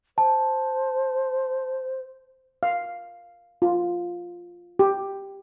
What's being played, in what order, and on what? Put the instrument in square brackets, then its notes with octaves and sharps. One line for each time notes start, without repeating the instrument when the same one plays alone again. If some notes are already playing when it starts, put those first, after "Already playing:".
[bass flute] C5 [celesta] A5
[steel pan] F5
F4
G4